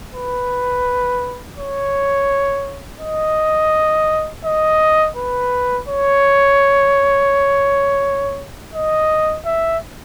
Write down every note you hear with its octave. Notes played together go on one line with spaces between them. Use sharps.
B4
C#5
D#5
D#5
B4
C#5
D#5
E5